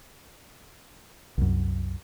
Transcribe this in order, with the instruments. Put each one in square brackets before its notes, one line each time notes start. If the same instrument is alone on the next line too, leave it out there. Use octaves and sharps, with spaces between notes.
[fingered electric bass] C2 F#2